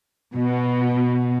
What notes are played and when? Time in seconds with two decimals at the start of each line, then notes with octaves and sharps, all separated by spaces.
0.35 B2